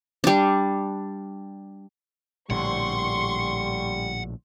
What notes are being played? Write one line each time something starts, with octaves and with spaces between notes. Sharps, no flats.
G3 D4
A#1 A2 D3 G3 F#5 C6 C#6